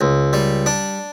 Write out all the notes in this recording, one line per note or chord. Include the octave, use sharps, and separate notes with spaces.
C#2
G3
D4